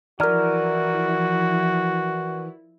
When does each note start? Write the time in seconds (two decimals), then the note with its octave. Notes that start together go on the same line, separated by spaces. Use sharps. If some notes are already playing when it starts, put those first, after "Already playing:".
0.20 E3 F3 E4 F#4 A#4 D5 A#5 F6